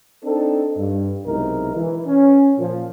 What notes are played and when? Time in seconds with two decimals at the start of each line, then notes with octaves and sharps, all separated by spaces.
0.24 C4 D4 D#4 A4
0.78 G2
1.26 B1 C3 G#3 D#4 E4 A#4
1.76 E3
2.07 C#4
2.59 A#2 F3